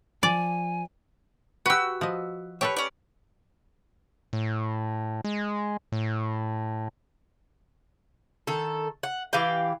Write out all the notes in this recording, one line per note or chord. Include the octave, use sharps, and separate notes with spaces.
F3 D5 G#5
F#4 G4 B4 E6
F3 B4 D#5
G4 A4 B4 C#5
C#4 D5
A2
G#3
A2
D#3 A4
F#5
E3 G4 F5 G5